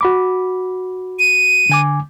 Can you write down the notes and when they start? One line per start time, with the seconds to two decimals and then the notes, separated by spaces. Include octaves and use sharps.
0.01 F#4 B5 D6
1.19 D#7
1.69 D3 G#5 D6